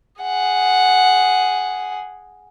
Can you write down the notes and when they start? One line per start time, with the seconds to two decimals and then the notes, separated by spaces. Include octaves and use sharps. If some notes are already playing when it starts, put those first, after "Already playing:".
0.22 G#4 F#5